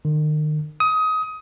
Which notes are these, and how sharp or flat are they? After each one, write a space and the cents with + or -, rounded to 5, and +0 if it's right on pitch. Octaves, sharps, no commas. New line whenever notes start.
D#3 -35
D#6 +20